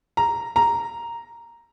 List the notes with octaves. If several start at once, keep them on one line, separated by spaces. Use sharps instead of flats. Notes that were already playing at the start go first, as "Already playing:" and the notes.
A#5
A#5